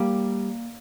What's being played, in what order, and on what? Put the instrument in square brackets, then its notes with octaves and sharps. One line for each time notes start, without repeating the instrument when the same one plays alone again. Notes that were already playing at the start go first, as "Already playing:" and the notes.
Already playing: [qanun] G3 A#3